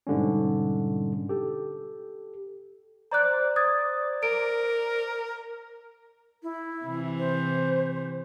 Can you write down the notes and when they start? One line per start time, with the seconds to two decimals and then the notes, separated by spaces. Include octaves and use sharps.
0.07 G#2 B2 D3 G3 C#4
1.29 G4 A4
3.11 C5 D5 A#5 D6 F#6
3.56 D#6 G#6 A6
4.23 A#4 D7
6.43 E4
6.85 C3 E3
7.19 C5